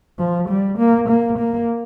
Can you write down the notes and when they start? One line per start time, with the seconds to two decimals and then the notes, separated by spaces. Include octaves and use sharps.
0.19 F3
0.49 G3
0.78 A#3
1.09 A#3
1.38 A#3